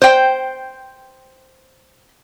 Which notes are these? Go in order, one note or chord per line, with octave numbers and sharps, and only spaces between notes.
C5 G5